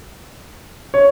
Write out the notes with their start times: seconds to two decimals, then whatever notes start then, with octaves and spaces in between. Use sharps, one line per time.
0.94 C#5